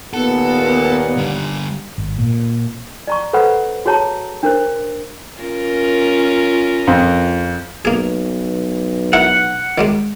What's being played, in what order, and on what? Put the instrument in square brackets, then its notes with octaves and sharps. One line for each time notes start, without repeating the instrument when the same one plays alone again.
[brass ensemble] D#2 A#2 [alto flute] B3 [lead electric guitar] A4 [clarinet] F#5
[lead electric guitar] D3 G3
[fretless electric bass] G#1
A#2
[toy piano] D5 A#5 C#6
A4 B4 C5 F#5 B5
F#4 G#4 C#5 A5 A#5
D4 A#4 C5
[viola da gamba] C#4 F4 A#4
[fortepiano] F2
[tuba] B1 [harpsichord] A#3 G#4
[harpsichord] E4 A#4 [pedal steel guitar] F#5
[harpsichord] D#3 G3 G#3